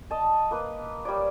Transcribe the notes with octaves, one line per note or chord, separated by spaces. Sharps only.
D#5 A5
A#3 B4
G3 C#5 D5